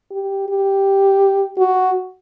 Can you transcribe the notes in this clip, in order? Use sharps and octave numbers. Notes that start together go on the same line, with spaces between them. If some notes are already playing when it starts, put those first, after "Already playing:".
G4
G4
F#4